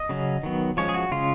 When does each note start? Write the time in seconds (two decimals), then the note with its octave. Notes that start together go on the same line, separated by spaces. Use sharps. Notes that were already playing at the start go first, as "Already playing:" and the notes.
Already playing: D#5
0.09 C#3 F#3 C#4
0.43 D#3 F#3 B3
0.77 F3 G#3 C#4 C#5
0.89 G#4
0.94 F#4
1.11 C#3 G#3 C#4 F4